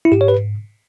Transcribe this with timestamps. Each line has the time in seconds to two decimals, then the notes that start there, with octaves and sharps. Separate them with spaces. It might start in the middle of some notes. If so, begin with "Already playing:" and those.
0.05 E4
0.12 G#2 G4
0.21 C#5
0.28 B4